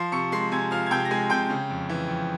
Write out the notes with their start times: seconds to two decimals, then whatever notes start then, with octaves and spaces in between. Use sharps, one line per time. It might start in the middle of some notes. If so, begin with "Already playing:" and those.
Already playing: F3 C6 C7
0.12 C3 C#6 C#7
0.32 G#3 C6 C7
0.52 C3 G#5 G#6
0.71 F3 F5 F6
0.87 G#6
0.91 C3 G5 G6
1.05 A#6
1.11 G#3 G#5 G#6
1.30 C3 G5 G6
1.50 C#3
1.70 F2
1.89 E3
2.08 F2